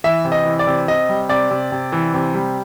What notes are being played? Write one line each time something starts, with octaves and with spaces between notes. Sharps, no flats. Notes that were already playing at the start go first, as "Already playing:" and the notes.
E3 E5
C3
D#5
E3
D5
C3
C3 D#5
G3
C3 D5
C3
C3
E3
C3
G3